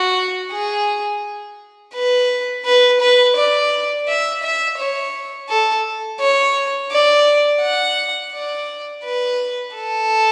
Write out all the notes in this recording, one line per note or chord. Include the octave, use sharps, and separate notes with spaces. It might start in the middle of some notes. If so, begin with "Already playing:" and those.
Already playing: F#4
G#4
B4
B4
B4
D5
E5
E5
C#5
A4
C#5
D5
F#5
D5
B4
A4